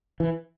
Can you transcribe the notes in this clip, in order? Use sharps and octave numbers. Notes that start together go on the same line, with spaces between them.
E3